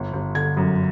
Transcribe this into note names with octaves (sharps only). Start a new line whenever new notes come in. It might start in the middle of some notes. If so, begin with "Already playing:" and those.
Already playing: G1
G1
D3 G#6
F#2